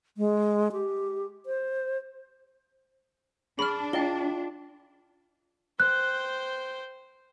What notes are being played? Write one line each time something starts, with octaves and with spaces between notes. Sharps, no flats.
G#3
G4
C5
D4 G#4 B5 F6
E4 F4 D#5 G5 G7
C5 G5 F#6